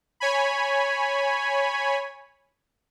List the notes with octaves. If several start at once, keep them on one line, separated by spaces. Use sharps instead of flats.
C#5 G#5 B5